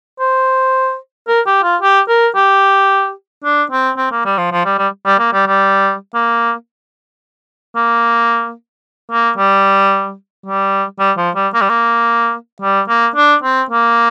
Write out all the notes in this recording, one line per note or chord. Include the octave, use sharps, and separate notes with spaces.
C5
A#4
G4
F4
G4
A#4
G4
D4
C4
C4
A#3
G3
F3
F3
G3
G3
G3
A#3
G3
G3
A#3
A#3
A#3
G3
G3
G3
F3
G3
A#3
G3
A#3
G3
A#3
D4
C4
A#3